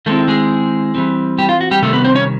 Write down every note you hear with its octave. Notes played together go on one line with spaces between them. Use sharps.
D#3 G#3 A3 C4 E4 A4
G#3 G#4
E3 G3 C4
G3 G4
F4
F#4
G3 G4
C3 D#3 G3 A3 A4
B3 B4
C4 C5
C#4 C#5